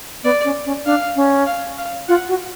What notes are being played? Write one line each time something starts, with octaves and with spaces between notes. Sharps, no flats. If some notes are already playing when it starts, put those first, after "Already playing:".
B3 D5
C#4
C#4
D4 F5
C#4
F5
F5
F4 F#5
F#4